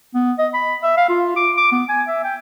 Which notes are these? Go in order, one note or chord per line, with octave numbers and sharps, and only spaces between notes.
B3
D#5
B5
E5
F5
F4
D6
D6
B3
G#5
E5
G5